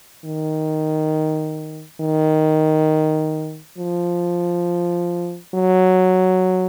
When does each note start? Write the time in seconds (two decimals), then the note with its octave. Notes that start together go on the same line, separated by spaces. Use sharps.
0.25 D#3
2.01 D#3
3.78 F3
5.55 F#3